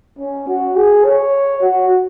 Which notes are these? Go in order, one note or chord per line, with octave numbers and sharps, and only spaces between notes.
C#4
F#4
G#4
C#5
F#4